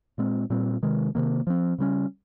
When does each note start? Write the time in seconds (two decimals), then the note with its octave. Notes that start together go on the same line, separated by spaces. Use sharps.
0.18 A#2 G#3 C4
0.50 A#2 G3 C4
0.83 C3 D#3 G#3
1.15 C3 D#3 A#3
1.47 F3 C4
1.78 C#3 G3 C#4